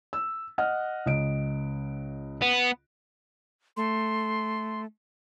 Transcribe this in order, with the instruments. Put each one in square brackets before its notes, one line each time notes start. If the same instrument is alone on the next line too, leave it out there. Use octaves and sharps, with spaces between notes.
[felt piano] E6
D#5 F#5 F6
C#2 D#5 D7
[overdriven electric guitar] B3
[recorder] A3 [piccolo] C6